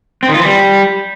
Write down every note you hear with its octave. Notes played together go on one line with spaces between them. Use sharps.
C4
D#3
F4
E3
G3